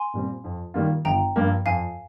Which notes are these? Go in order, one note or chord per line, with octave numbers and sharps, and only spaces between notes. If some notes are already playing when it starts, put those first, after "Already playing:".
Already playing: G#5 C6
A#2 G3 C4
F2
D#3 G3 A#3 F4
G1 G5 A#5
G2 F3 A#3
F2 F5 G#5